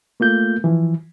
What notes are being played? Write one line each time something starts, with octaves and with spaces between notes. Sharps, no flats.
A3 A#3 F4 G6
E3 F3